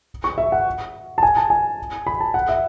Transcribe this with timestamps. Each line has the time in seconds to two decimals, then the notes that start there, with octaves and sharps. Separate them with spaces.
0.24 C#6
0.38 E5
0.52 F#5
1.18 A5
1.23 G#5
1.37 A5
1.50 G#5
2.07 B5
2.20 A5
2.34 F#5
2.49 E5